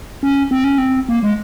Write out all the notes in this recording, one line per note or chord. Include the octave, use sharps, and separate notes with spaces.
C#4
C4
C#4
C4
A#3
G#3